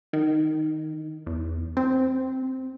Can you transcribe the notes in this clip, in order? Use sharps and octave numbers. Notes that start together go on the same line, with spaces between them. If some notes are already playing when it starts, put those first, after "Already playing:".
D#3
E2
C4